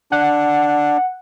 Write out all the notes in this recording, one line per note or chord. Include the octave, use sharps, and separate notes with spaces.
D4 F#5